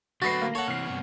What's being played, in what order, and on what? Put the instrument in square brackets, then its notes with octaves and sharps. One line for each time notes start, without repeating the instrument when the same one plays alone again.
[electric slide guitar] D3 F#3 A3 [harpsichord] B3 F#4 [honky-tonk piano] A6 A#6 C7
[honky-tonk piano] A#3
[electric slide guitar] A4 [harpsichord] C#5 F#5
[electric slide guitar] C3 E3 [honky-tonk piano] F6 C7
[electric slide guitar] G2 C3 B3